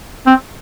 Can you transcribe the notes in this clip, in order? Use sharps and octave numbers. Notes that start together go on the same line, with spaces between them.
C4